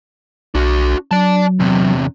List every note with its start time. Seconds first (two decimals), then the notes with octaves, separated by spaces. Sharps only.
0.55 B1 D4 F#4
1.11 F#3 D5 A5
1.60 E2 C3